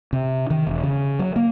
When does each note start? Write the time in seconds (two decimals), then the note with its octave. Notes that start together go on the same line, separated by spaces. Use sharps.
0.13 C3
0.50 D#3
0.67 E1
0.83 C#3
1.19 F#3
1.36 A#3